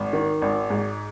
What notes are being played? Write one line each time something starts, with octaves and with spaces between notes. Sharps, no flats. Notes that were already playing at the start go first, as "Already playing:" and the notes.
Already playing: G#1
D#3
G#1
G#2